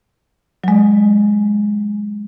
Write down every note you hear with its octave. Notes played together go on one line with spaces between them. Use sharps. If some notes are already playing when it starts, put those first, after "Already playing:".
F#3 G#3